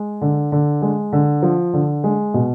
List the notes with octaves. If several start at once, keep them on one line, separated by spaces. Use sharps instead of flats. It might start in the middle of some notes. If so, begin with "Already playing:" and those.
Already playing: G#3
D3
D3
G#3
D3
F3
D3
G#3
B2